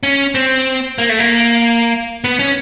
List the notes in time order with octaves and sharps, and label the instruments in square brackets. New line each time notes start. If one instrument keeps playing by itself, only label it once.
[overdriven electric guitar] C#4
C4
A#3
A3
A#3
B3
C#4